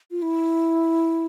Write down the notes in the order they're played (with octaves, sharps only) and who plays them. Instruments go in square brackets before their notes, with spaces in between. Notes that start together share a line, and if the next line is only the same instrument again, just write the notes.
[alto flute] F4
E4